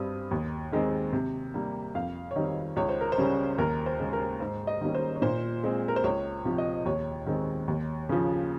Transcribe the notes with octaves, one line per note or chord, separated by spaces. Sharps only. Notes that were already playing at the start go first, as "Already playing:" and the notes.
Already playing: G2 G3 C4 D#6
D#2
D#3 G#3 C4
C3
G3 A#3
F2 F5
C#5
D#3 G3 C4 D#5
C#2 C#5
C5
A#4
C5
C#3 G3 C#4
D#2 A#4
C5
C#3 G#3
A#4
G#2 C5
D#5
D#3 G3 A#3 C#4
C5
C#5
A#2 C5
G#3 C4
A#4
C5
C#2 C#5
C3 F3
D#5
D#2 C#5
D#3 G#3 C4
D#2
C#3 F3